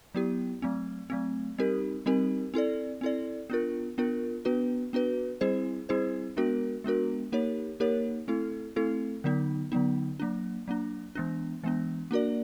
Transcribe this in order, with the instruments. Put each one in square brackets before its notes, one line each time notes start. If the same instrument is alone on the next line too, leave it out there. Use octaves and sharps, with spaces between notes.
[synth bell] F#3 B3 E4 G4
F#3 A3 C4
F#3 A3 C4
G3 C4 D#4 G4 A#4
G3 C4 D#4 G4 A#4
C4 E4 A4 D5
C4 E4 A4 D5
B3 D4 F4 A#4
B3 D4 F4 A#4
B3 D4 F#4 B4
B3 D4 F#4 B4
G3 C4 E4 G#4 C5
G3 C4 E4 G#4 C5
G#3 B3 D4 F#4 A#4
G#3 B3 D4 F#4 A#4
A#3 D#4 G4 A#4 C#5
A#3 D#4 G4 A#4 C#5
A3 C4 E4 A4
A3 C4 E4 A4
D3 F#3 B3 D#4
D3 F#3 B3 D#4
F#3 A#3 D4
F#3 A#3 D4
E3 G#3 B3 D4
E3 G#3 B3 D4
A#3 D4 F#4 A#4 D5